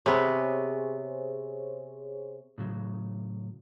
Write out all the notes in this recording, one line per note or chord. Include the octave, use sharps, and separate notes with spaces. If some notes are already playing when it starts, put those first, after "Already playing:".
C3 B3 G#4 C5 C#5
A2 C#3 F#3